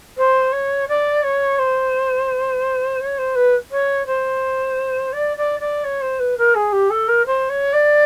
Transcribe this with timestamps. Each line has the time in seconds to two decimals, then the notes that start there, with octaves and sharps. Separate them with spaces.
0.17 C5
0.52 C#5
0.88 D5
1.23 C#5
1.58 C5
3.00 C#5
3.18 C5
3.35 B4
3.71 C#5
4.06 C5
5.12 D5
5.37 D5
5.59 D5
5.84 C#5
6.01 C5
6.19 B4
6.37 A#4
6.54 G#4
6.72 G4
6.90 A4
7.08 A#4
7.25 C5
7.49 C#5
7.73 D5